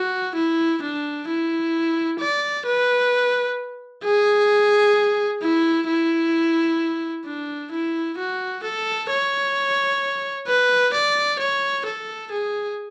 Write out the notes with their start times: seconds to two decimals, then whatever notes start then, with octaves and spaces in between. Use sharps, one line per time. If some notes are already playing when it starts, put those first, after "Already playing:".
Already playing: F#4
0.35 E4
0.82 D4
1.28 E4
2.20 D5
2.65 B4
4.04 G#4
5.42 E4
5.87 E4
7.25 D4
7.72 E4
8.18 F#4
8.63 A4
9.10 C#5
10.47 B4
10.94 D5
11.39 C#5
11.86 A4
12.31 G#4